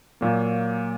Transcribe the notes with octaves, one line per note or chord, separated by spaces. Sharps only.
A#2 F#3 A#3